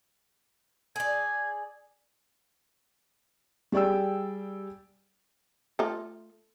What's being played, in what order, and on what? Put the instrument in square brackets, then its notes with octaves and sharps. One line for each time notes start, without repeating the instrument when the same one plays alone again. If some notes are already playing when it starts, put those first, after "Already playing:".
[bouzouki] G#4 D5 [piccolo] G#6
[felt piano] G3 G#4 D5 G5 E6
[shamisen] A3 F4